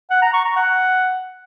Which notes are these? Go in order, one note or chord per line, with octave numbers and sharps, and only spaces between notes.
F#5
A#5
C#6
A#5
F#5